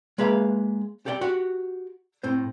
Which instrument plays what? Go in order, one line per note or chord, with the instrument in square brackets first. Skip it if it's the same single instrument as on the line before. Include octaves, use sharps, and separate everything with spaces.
[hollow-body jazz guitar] G#3 A#3 B4 E5 F5
G4 A4 D5 F#5 G5
F#4 G4 F#5
A2 C4 C5